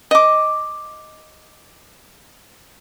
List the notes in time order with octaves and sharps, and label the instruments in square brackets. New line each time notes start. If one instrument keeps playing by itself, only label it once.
[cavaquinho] D#5 D6